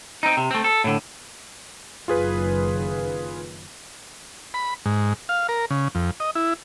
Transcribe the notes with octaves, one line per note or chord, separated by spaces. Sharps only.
C4 D#4
C3
A3 C4
A4
A2 D3
F#1 F#2 D#3 F4 G#4 B4
B5
G#2
F5
A#4
C#3
F2
D#5
E4